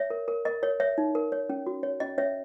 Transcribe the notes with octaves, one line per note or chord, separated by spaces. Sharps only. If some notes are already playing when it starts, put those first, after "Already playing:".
Already playing: C#5 E5
A#4
A#4
A#4 D#5
A#4 C#5
C#5 E5
D#4
A#4
C#5
C#4
F#4
C#5
C#4 D#5
C#4 C#5 E5